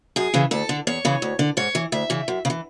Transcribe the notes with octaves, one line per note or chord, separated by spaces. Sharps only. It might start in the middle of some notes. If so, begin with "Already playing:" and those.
F#2 G#4
C#3 E3
D2 A4
D3
E2 C#5
C#3 E3
D2
D3
G#2 C#5
E3
D2 E5
C#3 E3
F#2
C#3
E3